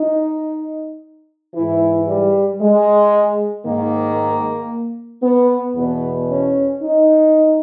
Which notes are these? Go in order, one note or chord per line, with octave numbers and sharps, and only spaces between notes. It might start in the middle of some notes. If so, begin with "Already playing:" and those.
Already playing: D#4
G#2 E3 E4
G3
G#3
G#2 D#3 A#3
B3
E2 B2 B3
C#4
D#4